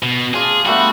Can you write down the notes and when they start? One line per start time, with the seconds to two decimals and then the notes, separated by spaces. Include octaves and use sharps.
0.03 B2
0.34 D4 F4 G#4
0.66 G3 A3 B3 F#4